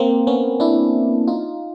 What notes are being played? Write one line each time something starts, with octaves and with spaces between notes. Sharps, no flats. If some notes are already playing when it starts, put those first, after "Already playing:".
Already playing: A#3 C4
B3 C#4
D4 E4
D#4 F4